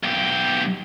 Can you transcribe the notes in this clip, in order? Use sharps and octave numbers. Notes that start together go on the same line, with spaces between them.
B1 G4